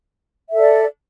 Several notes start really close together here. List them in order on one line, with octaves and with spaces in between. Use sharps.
E5 A4 D5